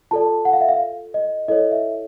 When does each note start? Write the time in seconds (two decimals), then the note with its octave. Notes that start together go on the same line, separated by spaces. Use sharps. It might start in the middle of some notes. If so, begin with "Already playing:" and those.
0.11 F4 A4 D5 A5
0.45 F#5
0.53 F5
0.61 E5
0.68 F5
1.14 D#5
1.48 E4 A4 C#5 D#5
1.71 E5